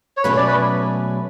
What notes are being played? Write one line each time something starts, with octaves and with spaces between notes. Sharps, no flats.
C#5
B2 F#3 A3 C#4 G#4 B4
D5
B4